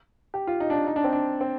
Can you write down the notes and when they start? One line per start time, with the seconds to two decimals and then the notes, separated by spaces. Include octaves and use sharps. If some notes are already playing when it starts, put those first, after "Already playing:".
0.34 G4
0.47 F4
0.60 D#4
0.70 D4
0.74 D#4
0.87 D#4
0.96 D4
1.04 C4
1.13 D4
1.41 C4